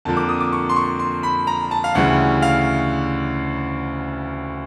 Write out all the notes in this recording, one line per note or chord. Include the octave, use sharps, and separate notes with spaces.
F2 D3 F3 A#3 A5
D6
D#6
D6
C#6
C6
C#6
C6
B5
A#5
A5
F5
D2 C#3 E3 G3 F#5
F5